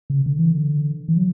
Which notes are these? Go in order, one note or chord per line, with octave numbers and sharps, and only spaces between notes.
C#3
D3
E3
D3
E3
F#3